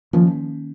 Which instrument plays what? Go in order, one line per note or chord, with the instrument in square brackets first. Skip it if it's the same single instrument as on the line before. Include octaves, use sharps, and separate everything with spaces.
[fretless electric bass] D#3 A#3 C#4 [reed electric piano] F3